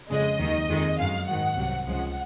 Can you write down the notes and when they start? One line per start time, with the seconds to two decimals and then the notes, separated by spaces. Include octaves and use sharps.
0.10 F2 C#3 G#3 D#5
0.39 D#2 D#3 F#3
0.68 F2 D#3 G#3
0.97 F#2 D#3 G#3 F5
1.26 G#2 D#3 F#3 F#5
1.56 C2 C3 F#3
1.86 C#2 C#3 F3 G#3 F#5